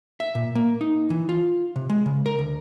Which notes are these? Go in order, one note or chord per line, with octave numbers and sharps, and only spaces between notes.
E5
A#2
A#3
D#4
E3
F4
C3
G#3
C#3
A#4
D2